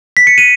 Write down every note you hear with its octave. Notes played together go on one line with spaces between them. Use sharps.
B6
C#7
D#7